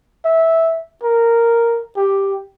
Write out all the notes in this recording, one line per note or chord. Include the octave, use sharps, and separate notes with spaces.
E5
A#4
G4